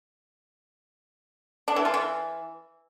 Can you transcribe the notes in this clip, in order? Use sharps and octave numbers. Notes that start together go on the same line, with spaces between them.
D4
E3
F4
E3